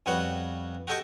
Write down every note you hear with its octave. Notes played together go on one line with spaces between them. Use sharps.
F2 G3 B3 F#4 C#5 F#5
F#4 G4 A4 D#5 G5 C#6